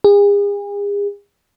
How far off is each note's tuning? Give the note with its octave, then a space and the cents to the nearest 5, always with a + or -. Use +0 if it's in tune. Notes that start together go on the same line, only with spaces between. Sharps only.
G#4 -40